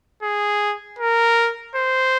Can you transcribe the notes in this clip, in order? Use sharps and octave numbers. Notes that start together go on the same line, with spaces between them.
G#4
A#4
C5